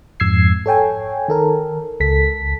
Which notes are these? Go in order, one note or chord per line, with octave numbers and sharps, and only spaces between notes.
F2 G#2 E6 G#6 C7
A4 C#5 G5 G#5
D#3 A4 A#4
C#2 A4 B6